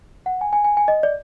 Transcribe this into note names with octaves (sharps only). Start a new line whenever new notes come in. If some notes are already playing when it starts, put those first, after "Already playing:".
F#5
G#5
G#5
G#5
G#5
D#5
D5